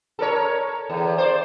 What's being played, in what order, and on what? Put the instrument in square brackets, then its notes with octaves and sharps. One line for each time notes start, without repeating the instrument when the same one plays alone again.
[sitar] A4 A#4 C#5
E2
C5 D5